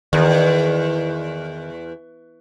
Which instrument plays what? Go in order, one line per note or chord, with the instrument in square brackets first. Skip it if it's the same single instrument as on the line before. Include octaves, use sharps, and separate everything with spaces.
[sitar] E2 [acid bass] D#3